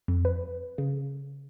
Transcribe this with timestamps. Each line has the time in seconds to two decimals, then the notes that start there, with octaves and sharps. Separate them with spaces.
0.08 F2
0.25 B4
0.78 C#3